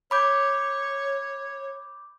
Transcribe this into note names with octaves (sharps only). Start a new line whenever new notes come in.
C#5 B5 D6 G6